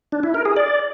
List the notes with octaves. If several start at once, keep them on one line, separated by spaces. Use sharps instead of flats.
D4
E4
A#4
G#4
D5